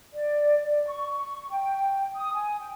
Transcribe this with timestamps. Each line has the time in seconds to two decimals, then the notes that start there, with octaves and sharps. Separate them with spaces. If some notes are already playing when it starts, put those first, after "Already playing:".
0.14 D5
0.63 D5
0.88 C#6
1.50 G5
2.16 D#6
2.33 G#5
2.60 G5